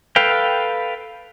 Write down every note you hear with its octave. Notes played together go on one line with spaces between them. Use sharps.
A4 B4 F5 G5